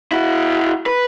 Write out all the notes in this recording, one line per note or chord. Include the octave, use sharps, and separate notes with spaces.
E4 F#4
B4